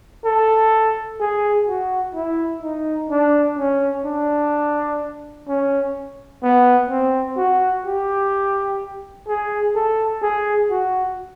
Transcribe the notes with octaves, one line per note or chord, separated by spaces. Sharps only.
A4
G#4
F#4
E4
D#4
D4
C#4
D4
C#4
B3
C4
F#4
G4
G#4
A4
G#4
F#4